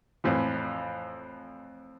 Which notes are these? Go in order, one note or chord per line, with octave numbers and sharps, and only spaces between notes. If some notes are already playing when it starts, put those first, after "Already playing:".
F2 A2 E3 F3